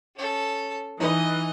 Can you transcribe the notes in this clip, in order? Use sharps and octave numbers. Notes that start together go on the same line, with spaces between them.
C#4 A4
E3 D#4 B4 D#5